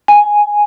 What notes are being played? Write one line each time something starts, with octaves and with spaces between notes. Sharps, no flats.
G#5